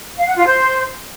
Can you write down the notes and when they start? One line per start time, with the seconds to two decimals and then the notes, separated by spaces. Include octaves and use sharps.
0.17 F5
0.26 F#5
0.36 F4
0.45 C5